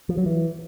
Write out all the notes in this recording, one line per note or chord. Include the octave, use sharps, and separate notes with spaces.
F3
F#3
E3